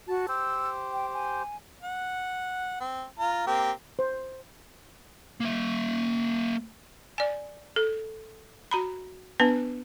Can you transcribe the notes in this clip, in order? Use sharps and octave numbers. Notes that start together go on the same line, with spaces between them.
F#4 A5
G4 C5 E6
G5
G#5
F#5
C4
F4 A#5
A#3 C4 G4
C5
A#3 E5
D5 G#5
A4
F#4 A#5 B5
B3 D4 B4 A5